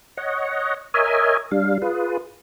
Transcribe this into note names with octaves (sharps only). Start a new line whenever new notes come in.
C#5 D#5 F#5
A#4 C#5 D#5 E5 G#5
G3 D4 F5
F4 G#4 B4